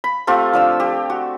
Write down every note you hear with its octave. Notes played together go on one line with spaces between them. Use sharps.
B5
A3 C4 F4 G4
F3 D4 E6
G4
F#4